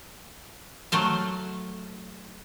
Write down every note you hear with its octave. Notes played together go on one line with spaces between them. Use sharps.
F#3 A3 C5 F5